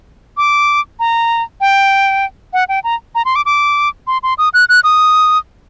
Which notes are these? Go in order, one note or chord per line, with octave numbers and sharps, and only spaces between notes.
D6
A#5
G5
F#5
G5
A#5
A#5
C6
D6
D6
C6
C6
D#6
F#6
F#6
D#6